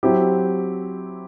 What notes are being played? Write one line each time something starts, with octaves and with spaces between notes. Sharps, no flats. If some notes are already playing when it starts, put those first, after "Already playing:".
F#3 C4 E4 G4